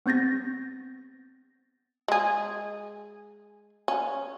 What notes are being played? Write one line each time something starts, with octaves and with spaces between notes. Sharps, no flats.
B3 C4 G6 A6 A#6
G#3 G#4
C#4